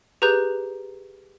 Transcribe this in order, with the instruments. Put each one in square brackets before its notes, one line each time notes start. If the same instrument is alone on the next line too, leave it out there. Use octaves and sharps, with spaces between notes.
[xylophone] G4 G#4 B4 A#5 F#6 G6